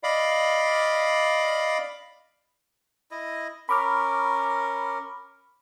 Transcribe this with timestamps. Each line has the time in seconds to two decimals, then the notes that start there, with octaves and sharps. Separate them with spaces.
0.03 D5 D#5 F5 B5
3.11 E4 D#5
3.69 C#4 A#4 B5 D6 F6